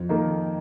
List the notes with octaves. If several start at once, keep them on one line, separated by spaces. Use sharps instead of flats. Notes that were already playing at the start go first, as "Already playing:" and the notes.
Already playing: F2
D#3 A#3 D#4